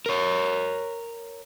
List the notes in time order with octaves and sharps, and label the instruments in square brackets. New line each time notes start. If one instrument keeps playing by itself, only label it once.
[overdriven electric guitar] A#4 C#5